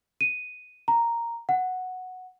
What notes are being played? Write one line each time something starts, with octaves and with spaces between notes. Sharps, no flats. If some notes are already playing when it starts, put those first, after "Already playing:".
D#7
A#5
F#5